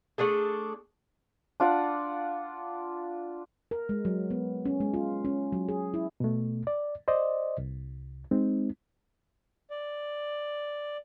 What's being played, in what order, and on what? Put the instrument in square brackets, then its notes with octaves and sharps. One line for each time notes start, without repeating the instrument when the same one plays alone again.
[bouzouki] A3 D4 G#4 A4
[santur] D4 F4 D5 F#5
[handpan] A#4
G#3
F#3
B3
C#4
G#3
F4
C#4
F#3
G#4
E4
[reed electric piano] B2 A3
D5
C5 D5 D#5
C2
G#3 C4 D#4
[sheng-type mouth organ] D5